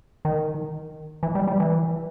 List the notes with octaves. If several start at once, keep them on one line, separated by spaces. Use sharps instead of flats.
D#3
E3
G3
G3
E3